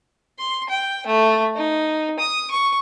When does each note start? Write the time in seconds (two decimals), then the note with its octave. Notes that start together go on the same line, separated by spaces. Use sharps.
0.39 C6
0.69 G5
1.06 A3
1.56 D#4
2.19 D#6
2.51 C#6